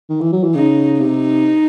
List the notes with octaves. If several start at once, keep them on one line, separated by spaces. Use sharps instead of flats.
D#3
E3
F#3
E3
C#3 D#4
C3 D#4